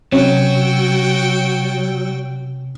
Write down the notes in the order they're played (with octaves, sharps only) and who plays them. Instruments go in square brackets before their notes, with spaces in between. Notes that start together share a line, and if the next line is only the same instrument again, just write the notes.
[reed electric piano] C3 [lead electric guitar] F#3 [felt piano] C#4 [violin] F#4 G5